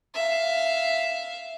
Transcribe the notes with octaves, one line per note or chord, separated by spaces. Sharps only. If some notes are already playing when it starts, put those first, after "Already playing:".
E5 F5